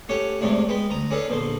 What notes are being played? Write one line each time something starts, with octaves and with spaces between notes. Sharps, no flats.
A3 C#4 G4 C#5 F#5
E2 A2 C3 G#3 A3 D4
G#3 B3 G5 B5
D2 A#5 D#6
C#4 D4 G#4 A4 B4
A#1 B2 D3 C5